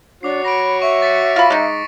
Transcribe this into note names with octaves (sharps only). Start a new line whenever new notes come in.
D4 F#4 C#5 D6 C7
B5 A#6 D7
E5 C#6
A6 B6 C#7
F4 B5 A#6
G#3 D#4